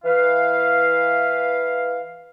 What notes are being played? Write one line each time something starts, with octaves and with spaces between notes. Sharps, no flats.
E3 B4 F5